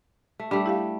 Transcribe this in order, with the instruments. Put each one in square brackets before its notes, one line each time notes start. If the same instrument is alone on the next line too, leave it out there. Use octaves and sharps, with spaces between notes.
[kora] A3
[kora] G3 A3 [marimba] D4
[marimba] E4 G4 F5